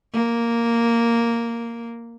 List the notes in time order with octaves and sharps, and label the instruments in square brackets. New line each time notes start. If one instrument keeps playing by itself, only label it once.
[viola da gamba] A#3